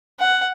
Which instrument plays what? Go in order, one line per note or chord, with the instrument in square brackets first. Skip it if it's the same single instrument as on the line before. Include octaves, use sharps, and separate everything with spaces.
[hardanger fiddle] F#5